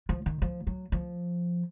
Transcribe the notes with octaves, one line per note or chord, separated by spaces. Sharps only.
F3
D#3
F3
F#3
F3